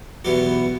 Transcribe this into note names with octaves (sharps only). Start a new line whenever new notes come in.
E2 B2 F#3 G4